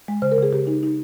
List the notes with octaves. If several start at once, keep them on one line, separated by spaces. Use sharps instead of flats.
G#3
C#3 C5
A#4
C#3 G#4
C#3 G4
D#4
D#4